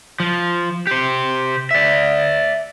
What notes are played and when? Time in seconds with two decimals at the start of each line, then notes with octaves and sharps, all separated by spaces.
0.20 F3
0.87 G4 C5
1.71 D5 E5